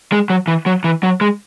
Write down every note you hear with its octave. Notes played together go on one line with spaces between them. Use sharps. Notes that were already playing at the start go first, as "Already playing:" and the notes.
G#3
F#3
E3
F#3
E3
F#3
G#3